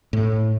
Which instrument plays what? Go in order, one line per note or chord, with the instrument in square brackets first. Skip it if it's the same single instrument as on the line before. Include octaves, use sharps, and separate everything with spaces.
[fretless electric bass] A2